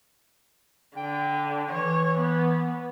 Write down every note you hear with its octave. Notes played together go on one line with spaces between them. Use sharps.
D3 G5
E3 C#5
B3